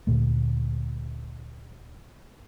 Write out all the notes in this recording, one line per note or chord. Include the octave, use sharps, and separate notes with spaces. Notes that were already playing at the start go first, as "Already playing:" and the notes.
D2 A#2 A3